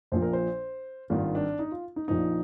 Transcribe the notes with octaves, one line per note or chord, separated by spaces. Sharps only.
A#1 A#2 F3 C5
A#4
C5
G#1 G2 D#3 F4
D4
D#4
F4
D#4
A#1 A#2 F3 D#4